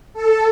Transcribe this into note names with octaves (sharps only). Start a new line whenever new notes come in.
A4